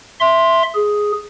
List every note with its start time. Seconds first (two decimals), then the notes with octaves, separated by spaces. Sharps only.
0.20 E5 C6
0.75 G#4